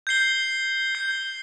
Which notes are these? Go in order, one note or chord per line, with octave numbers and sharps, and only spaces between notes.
G6 C7 G7
G6 C7 G7